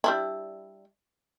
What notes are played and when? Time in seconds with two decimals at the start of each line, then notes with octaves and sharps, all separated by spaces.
0.04 G3 D4 E4